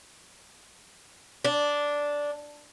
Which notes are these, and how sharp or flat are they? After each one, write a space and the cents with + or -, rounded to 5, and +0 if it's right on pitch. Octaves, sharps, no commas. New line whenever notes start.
D4 -5